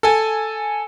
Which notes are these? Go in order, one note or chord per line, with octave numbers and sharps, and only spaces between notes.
A4 G#5